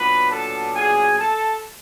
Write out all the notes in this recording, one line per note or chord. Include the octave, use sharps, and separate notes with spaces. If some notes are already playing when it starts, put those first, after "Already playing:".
Already playing: A#2 F#3 B3 D4 B4 B5
A4 A5
G#4 G#5
A4 A5